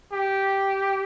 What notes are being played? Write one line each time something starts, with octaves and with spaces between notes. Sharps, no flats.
G4